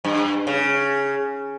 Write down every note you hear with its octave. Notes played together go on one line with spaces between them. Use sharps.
G2
C#3